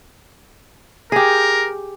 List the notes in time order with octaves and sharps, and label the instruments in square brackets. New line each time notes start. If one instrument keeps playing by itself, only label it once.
[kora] G4 G#4 [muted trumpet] A#4